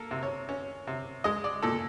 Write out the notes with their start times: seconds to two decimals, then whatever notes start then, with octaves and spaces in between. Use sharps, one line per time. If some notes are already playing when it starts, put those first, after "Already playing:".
Already playing: A#3 A4 A#4
0.11 C3
0.23 C#5
0.49 C#4
0.87 C3
1.24 G#3 D#5
1.44 D5
1.62 A#2 A4